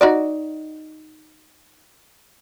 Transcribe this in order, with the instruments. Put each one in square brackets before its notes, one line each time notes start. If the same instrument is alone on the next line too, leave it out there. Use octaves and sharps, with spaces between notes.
[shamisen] D#4 F#4 D5